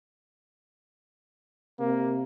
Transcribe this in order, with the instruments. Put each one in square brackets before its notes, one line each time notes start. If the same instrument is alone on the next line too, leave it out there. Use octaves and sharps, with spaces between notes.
[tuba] C3 [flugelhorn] A#3